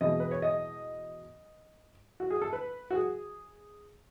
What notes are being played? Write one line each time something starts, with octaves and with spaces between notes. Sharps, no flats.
E2 B2 G#3 D#5
B4
C#5
D#5
F#4
G#4
A4
B4
F#4
G#4